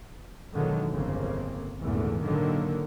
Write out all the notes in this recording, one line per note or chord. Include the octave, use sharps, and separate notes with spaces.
B1 E2 D3 D#3 F#3 G#3
G1 F2 C#3 A#3 C4
G#1 E2 A#2 D3 A3
A#2 D3 D#3 F#3 A#3